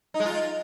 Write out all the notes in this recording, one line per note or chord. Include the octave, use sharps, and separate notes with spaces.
D#4
G#3
F4